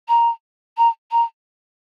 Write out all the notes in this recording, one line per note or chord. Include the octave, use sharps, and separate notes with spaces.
A#5
A#5
A#5